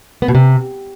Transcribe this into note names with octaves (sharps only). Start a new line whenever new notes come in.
B3
B2
C3